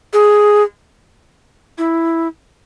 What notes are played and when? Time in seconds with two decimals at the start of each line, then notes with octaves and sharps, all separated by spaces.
0.13 G#4
1.78 E4